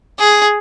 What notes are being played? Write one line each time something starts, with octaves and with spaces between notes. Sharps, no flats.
G#4